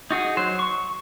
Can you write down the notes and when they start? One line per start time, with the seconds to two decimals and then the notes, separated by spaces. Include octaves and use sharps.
0.11 D#4 F#4 G#4
0.37 F#3 C5
0.59 C#6